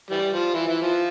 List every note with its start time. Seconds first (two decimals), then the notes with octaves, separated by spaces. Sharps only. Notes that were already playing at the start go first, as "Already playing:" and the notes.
0.11 E3 G3
0.32 F3
0.54 E3
0.68 E3
0.82 F3